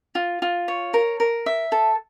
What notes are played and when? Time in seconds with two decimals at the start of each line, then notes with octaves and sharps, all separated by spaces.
0.15 F4
0.42 F4
0.68 C#5
0.94 A#4
1.20 A#4
1.46 E5
1.72 A4